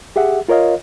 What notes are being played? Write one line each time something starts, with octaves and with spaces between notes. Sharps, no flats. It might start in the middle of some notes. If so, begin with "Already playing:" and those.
G4 G#4 E5 F#5
F4 A#4 C#5 D#5 F5